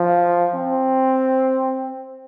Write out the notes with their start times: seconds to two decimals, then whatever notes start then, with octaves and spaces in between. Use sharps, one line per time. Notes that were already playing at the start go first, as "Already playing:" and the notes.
Already playing: F3
0.55 C4